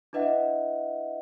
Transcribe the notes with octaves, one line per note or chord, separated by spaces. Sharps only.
D4 E4 B4 D#5 E5 F#5